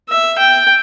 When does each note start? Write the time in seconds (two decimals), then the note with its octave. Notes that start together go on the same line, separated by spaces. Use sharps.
0.09 E5
0.38 G5